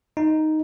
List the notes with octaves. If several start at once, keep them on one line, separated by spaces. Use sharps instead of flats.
D#4